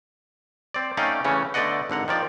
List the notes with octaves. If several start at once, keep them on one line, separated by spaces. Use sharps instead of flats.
C4 D5
A3 C#4 D#4 D5 F5 G5
C#3 E3 A3 C#4
D3 A3 B3 D5 D#5 F#5
G#1 D3 F#5 A#5
D#3 F3 D5